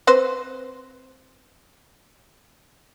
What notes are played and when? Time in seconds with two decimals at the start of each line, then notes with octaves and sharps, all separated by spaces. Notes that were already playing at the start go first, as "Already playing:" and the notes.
0.07 C4 B4 C5